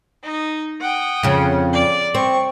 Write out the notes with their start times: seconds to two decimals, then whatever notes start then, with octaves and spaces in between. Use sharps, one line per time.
0.24 D#4
0.81 F#5 G5 D#6
1.23 F2 C#3
1.72 D5
2.15 C4 C#6